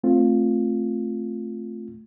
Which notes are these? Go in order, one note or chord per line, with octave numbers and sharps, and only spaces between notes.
A3 C4 F4